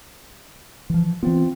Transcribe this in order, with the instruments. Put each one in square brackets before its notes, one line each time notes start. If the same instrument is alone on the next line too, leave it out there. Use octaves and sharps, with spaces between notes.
[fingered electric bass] E3 F3
[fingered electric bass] E3 B3 [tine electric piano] C4 F4